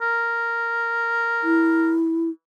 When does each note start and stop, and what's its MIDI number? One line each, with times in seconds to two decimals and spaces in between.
0.01 1.93 70
1.44 2.30 64